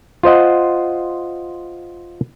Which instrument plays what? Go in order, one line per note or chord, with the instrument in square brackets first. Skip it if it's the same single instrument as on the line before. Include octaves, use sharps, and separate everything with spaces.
[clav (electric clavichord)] F4 C5 D#5 F#5